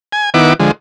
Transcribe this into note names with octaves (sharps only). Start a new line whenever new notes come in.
G#5
D#3 B3 E4 F#5 D6
D3 F3 G#3